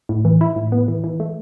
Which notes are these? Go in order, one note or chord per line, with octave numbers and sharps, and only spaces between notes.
A2
E3
E4
A2
B3
E3
E3
A3